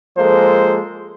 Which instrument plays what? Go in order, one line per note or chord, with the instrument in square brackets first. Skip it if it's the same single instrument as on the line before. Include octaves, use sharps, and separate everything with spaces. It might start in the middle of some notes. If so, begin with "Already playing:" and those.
[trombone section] F3 G#3 A#3 A4 C5